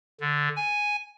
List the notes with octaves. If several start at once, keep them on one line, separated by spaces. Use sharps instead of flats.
D3
G#5